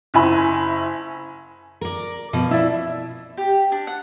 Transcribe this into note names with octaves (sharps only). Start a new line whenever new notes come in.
F#1 E4 G#5 B5
A#4 D5
B2 F3
E4 D5 E5
G4
D4
F#5